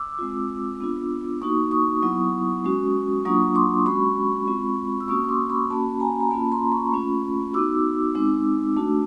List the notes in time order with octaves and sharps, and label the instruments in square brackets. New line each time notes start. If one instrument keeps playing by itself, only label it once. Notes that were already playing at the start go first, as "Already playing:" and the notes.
Already playing: [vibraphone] D6 E6
G#3 C4 F4
B3 D4 F4
A#3 D#4 F#4 C#6 D#6
C#6 D#6
F#3 B3 E4
G#3 C#4 F#4
F#3 A#3 D4 F4 C#6 D#6
C6 D6
G#3 C#4 F#4 B5 C#6
G#3 C4 F4
E6
A#3 C#4 F#4 C#6 D#6
C#6
C6 D6
B5 C#6
A#3 C#4 F#4 A5 B5
G#5 A#5
A#5
A#3 C#4 F4 A5 B5
A#5 C6
B5 C#6
A3 C#4 F4
B3 D#4 F#4 D6 E6
G#3 C4 D#4
A3 D4 F#4